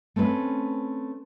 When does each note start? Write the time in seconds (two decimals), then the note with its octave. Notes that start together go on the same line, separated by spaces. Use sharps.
0.16 A3 C4 C#4 B4